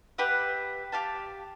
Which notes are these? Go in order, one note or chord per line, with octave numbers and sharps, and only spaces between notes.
G4 B4 E5 F#5
G4 F5 A5